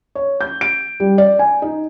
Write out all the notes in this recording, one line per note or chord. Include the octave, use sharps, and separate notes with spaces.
C#5
G6
D7
G3
D5
G#5
D#4